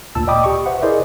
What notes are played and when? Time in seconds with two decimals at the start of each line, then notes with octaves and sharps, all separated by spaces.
0.15 D2 A#2 A5 E6
0.27 D5 D#5 G5 B5 D6 D#6
0.44 G4 C#6
0.66 B4 C5 E5 F#5
0.82 E4 G#4 A#4 C5 D5 D#5